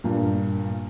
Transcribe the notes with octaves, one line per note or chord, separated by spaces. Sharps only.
G2 A#2